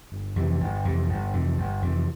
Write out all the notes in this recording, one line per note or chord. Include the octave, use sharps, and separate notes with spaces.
G1
F2 C3 E3
G1
F2 C3 E3
G1
F2 C3 E3
G1
F2 C3 E3